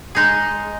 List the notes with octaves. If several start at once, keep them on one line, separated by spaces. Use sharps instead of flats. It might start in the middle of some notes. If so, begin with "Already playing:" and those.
G#3 D#4 G#4